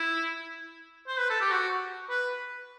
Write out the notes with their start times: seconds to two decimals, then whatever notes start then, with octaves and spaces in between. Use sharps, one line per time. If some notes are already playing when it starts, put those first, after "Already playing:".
Already playing: E4
1.07 C5
1.19 B4
1.30 A4
1.41 G4
1.51 F#4
2.10 B4